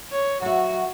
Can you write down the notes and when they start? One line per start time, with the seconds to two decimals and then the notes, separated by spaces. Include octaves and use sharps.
0.12 C#5
0.42 F#3 F#4 E5